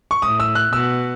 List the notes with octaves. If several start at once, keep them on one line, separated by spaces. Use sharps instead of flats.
C#6
A2 D#6
E6
F#6
B2 E6